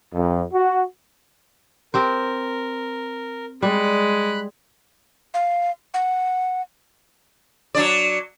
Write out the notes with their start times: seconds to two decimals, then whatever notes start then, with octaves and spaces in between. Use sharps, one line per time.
0.13 F2
0.53 F#4
1.94 C4 G4 A#4 C5
3.62 G3 G#3 B5 F#6
5.34 F5
5.94 F#5
7.75 F#3 D4 D5